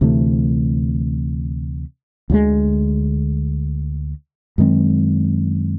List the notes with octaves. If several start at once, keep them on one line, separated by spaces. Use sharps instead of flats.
D2 C3 E3 A3
D2 D3 F3 G#3
F#2 D#3 G#3 C4